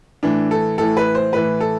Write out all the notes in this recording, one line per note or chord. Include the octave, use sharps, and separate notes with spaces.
A2 E3 D4
A4
A2 E3 A4
B4
C5
A2 E3 B4
A4